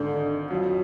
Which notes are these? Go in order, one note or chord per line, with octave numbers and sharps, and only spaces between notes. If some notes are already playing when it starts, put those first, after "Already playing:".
Already playing: G#1 G#2 D3
F2 F#3